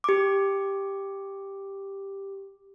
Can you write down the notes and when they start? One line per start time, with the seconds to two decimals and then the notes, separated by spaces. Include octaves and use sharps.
0.04 G4 D6